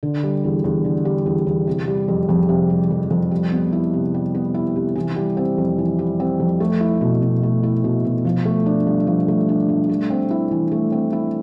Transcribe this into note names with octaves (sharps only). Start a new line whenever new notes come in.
D3
G3
E2
E2
D3
G3
E2
E2
C3
G3
F2
F2
C3
G3
F2
F2
G3
B3
E4
C3
G3
B3
E4
C3
E3
G3
C4
F2
E3
G3
C4
F2
A3
E4
B2
B2
A3
E4
B2
B2
F3
A3
D4
G2
F3
A3
D4
G2
A3
C4
E4
E3
A3
C4
E4